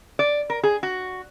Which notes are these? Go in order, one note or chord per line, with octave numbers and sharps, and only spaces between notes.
D5
A#4
G#4
F#4